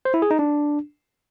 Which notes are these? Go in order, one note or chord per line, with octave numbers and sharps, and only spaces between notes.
C5
E4
G#4
D#4
D4